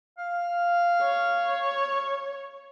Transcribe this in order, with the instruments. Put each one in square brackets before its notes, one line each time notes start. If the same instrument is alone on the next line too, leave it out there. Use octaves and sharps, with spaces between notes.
[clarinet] F5
[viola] C#5